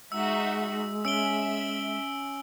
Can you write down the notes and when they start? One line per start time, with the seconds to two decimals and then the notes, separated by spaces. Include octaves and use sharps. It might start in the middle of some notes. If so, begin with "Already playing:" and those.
0.12 G#3 D#4 F#4 E5 E6
1.05 C#4 E5 E6 D7 G7